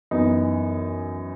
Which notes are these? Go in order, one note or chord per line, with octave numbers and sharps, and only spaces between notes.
F#2 E3 B3 D#4